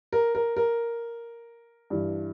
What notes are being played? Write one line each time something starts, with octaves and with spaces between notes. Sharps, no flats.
A#4
A#4
A#4
G2 E3